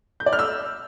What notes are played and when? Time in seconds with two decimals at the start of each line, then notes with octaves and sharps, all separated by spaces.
0.20 G6
0.26 D5
0.33 F6
0.39 E6